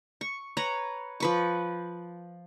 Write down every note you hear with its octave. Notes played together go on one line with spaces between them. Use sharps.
C#6
B4 C#5 A#5
F3 B4 C#6